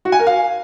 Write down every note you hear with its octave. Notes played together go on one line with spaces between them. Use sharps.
F#4
G#5
A#4
F5